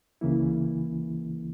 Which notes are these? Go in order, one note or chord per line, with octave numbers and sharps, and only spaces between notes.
C#2 C#3 E3 A#3 E4